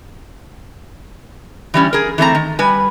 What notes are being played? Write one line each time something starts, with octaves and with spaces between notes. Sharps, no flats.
E3 G3 C#4
G#4 A#4
E3 A3 C4 A#5
D#3
G3 B4 G#5